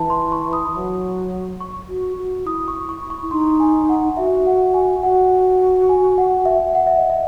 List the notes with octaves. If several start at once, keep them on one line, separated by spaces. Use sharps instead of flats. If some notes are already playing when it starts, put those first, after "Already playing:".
Already playing: E3 A5
C6
C#6
D#6
F#3
C#6
F#4
F#4
E4 D#6
C#6
C#6
C#6
D#4 C6
G#5
F#5
F#4 E5
F#5
G#5
F#4 F#5
G#5
F#5
E5
F#5
E5
D#5
E5